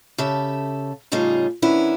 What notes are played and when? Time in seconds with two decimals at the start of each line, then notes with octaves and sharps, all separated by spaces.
0.18 C#3 G4 A4 E5
1.12 A2 C#3 G3 D#4 F4 G#4
1.62 D#3 E3 B3 C#4 D4 E4